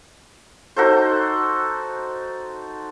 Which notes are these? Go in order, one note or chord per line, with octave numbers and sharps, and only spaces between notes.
D#4 F#4 A4 C5